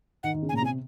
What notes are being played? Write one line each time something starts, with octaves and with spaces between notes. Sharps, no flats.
D#3 F#5
D#3
C#3
G#5
A#2 A#5
C3 G#5